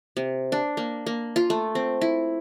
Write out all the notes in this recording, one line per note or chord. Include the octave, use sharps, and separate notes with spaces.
C3
D4
A#3
A#3
F4
A3
C4
E4